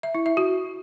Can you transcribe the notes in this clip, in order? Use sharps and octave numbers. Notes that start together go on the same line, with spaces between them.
E5
E4
E5
F#4